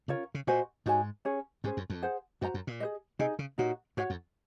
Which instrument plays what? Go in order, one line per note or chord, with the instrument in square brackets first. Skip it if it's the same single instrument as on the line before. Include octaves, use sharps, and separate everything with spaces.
[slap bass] C#3 [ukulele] C#4 F4 A#4 C#5
[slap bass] C#3
[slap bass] A#2 [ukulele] F#4 C5 D#5 G#5
[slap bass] G#2 [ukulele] D#4 F#4 C#5 G#5
[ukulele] C#4 G#4 C#5
[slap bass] G#2 [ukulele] C#4 G#4 C5
[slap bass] F#2
F2
[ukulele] G#4 C5 F#5
[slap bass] F#2 [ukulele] F#4 C5 F#5 A#5
[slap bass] F#2
A#2
[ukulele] G#4 C5 D#5
[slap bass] C3 [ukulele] D#4 G#4 D#5
[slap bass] C#3
[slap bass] A#2 [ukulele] D#4 F#4 C#5
[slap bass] G#2 [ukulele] F#4 C#5 F#5
[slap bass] F2